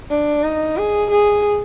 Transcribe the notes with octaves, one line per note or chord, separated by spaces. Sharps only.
D4
D#4
G#4
G#4